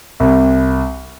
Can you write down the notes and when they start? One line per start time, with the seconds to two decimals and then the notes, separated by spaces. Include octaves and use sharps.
0.20 C2